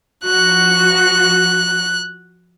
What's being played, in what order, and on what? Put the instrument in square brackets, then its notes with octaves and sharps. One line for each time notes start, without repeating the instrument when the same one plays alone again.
[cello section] F3 F#4 [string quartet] F#6